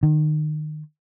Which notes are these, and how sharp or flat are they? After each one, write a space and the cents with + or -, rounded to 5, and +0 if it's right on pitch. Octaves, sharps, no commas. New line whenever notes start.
D#3 -30